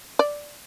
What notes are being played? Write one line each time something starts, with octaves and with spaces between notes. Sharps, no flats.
D5